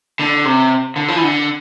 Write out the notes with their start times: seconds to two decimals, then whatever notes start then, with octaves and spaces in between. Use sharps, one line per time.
0.19 D3
0.45 C3
0.96 D3
1.08 F3
1.16 E3
1.23 D3